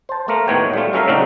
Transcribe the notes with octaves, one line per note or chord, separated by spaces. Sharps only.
C5 A5
A3 A#3 A#4
D#2 A2 D#3 B3 C#5 G5
G3 A3 F4
F#3 C#4 A4 A#4 E5 F5
A2 C#3 C4 D4 D#4 F#4